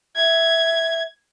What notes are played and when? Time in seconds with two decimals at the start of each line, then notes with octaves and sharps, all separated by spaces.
0.16 E5 G#6